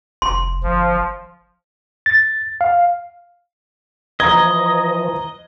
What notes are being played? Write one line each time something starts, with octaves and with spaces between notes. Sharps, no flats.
F1 C6
G1 F3
A6
F5
E3 F3 D#5 A#5 G#6